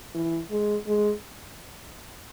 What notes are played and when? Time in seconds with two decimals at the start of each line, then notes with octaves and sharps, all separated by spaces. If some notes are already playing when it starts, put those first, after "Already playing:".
0.15 E3
0.51 G#3
0.87 G#3